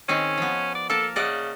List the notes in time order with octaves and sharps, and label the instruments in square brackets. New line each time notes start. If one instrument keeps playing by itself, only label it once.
[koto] D#3 C4 G#4 [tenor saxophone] C#4
[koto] F3 B3
[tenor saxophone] D5
[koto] A#3 A#4 A5 [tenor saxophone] A4
[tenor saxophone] C#3 [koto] D5 D#5 F#5